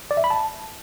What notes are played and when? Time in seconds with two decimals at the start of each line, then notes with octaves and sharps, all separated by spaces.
0.11 D5
0.17 E5
0.24 B5
0.30 A5